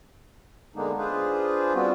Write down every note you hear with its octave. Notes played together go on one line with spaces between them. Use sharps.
D3 G#3 A#3 B3 D4 D#4
D4 F4 G#4 B4 C5
G3 B3 C4 F4 F#4